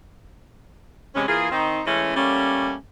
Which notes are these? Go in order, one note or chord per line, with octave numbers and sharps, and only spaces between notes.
C3 E3 G#3 C#4
E3 A#3 F4 G#4
D#3 C4 D#4
E3 G#3 A3 C#4
G3 A3 A#3 C#4